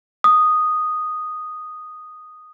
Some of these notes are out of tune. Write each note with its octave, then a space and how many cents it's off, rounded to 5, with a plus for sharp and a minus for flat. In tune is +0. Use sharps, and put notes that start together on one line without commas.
D#6 -5